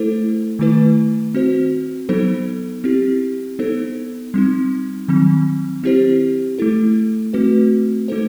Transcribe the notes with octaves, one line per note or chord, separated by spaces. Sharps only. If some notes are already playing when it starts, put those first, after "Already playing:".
Already playing: A3 E4 A4 C5
D#3 A3 E4 B4
C4 F#4 C5
F#3 B3 D#4 A4 C5
C4 E4 G4
B3 D#4 A4 C5
G3 C4 D#4
D#3 F#3 C4
C4 E4 G4 C5
A3 E4 A4
A3 C4 F#4 B4
A3 D#4 A4 C5